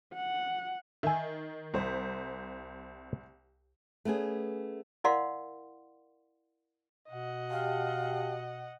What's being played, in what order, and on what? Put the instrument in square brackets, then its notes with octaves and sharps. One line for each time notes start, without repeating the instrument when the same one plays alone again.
[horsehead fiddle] F#5
[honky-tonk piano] D#3 [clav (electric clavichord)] E5 G#5
[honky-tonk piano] C2 C5
[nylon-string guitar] A3 B3 C#4 G#4
[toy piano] E4 A#4 D5 F5 F#5 C6
[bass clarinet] B2 [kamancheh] D#5 F#5
[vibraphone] G4 G5 A5 [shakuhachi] F5